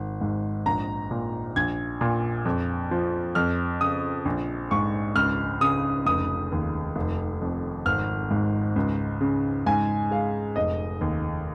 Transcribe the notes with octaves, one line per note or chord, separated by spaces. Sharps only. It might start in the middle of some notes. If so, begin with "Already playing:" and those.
Already playing: G#1
G#2
A#1 A#5
A#2
A#1 G#6
A#2
F2
F3
F2 F6
C#3 D#6
A#1
G#2 C#6
C#2 F6
C#3 D#6
F1 D#6
D#2
F1
F2
G#1 F6
G#2
C#2
C#3
G#2 G#5
G#3 F5
F1 D#5
D#2